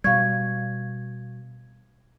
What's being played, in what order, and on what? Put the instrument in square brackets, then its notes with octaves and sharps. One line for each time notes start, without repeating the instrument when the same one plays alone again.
[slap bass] B2 G3 [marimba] F5 C#6 [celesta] G#6